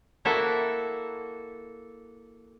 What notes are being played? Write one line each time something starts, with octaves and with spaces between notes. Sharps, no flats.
A#3 E4 F#4 A4 E5 A5